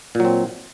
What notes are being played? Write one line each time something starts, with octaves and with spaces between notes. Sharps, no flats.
A#2 F#3 C4